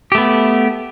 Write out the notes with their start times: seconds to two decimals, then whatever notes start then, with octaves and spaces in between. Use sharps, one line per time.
0.12 G4
0.15 A3
0.18 B3